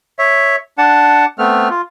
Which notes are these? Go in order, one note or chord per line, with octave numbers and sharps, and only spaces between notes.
C#5 E5
D4 F#5 A5
A3 B3 C4 F6
F4